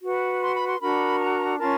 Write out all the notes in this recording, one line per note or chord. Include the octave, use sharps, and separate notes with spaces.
F#4 B4
C6
B5
C6
D4 F#4 A#4 B5
A#5
C#4 F4 A#4 A5